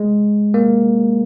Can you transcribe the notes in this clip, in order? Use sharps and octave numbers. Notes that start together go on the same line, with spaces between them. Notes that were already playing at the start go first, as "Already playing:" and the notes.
Already playing: G#3
A#3